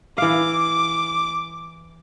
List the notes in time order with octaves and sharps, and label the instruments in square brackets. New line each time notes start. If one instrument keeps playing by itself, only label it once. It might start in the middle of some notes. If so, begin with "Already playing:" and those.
[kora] E3 F5 [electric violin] D6